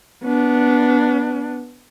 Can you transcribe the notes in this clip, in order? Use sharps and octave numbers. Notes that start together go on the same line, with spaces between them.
B3 D4